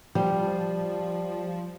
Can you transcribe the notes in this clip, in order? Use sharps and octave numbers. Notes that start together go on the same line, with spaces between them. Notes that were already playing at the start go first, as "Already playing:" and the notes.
F3 G3